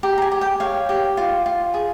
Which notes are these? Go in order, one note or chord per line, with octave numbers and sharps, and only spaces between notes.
G4 A#5
A#5
G#5
G4
G5
C#5 F5
G4
F4
F4
G#4